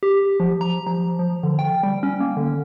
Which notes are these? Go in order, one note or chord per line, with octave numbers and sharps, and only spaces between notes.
G4
F3
A#5
F3
F3
D3
G5
G3
C#4
A#3
D3